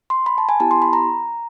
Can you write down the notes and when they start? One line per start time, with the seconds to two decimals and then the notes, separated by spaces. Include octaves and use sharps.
0.10 C6
0.26 B5
0.38 A5
0.49 G#5
0.60 B3 E4 G4 A5
0.71 C6
0.82 B5
0.93 A#5